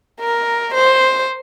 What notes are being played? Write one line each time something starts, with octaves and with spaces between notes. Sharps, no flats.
A#4
C5